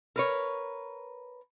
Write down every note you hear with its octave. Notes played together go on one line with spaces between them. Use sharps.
A#4 B4 C#5